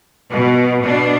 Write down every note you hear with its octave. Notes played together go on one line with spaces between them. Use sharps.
B2
B2 D4